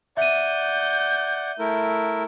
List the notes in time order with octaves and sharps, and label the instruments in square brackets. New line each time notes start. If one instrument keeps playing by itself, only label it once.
[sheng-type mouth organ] D5 F#5 [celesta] E5 D#7 [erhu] G6
[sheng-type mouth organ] A3 E4 A#4